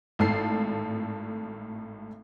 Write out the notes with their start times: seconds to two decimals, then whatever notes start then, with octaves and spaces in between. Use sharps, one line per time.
0.19 G#1 A2 A4 C7